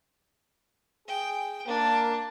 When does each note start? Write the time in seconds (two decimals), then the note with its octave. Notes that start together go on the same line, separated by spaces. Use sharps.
1.08 G#4 G5
1.67 A#3 D4